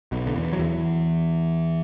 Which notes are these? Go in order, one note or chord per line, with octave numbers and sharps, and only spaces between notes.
B1 B2
D3
E2 E3
F#3
E2 E3